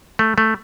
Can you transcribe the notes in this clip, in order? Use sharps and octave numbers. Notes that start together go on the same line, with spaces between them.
A3
A3